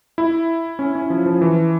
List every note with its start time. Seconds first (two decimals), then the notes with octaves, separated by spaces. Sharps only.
0.18 E4
0.79 C#4
0.95 C#4
1.10 F3
1.26 F3
1.42 E3